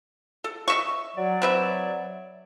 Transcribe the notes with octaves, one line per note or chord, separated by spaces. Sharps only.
A4
D#5 E5 C#6
F#3 D5
C4 B4 E5